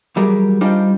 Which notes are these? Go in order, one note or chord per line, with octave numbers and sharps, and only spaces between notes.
E3 F#3 G3 G#4 A#4
G3 D4 D#4 F4 C5